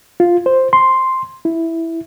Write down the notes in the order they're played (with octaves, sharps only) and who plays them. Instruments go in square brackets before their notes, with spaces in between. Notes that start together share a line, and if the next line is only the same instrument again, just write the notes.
[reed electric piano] F4
C5
C6
E4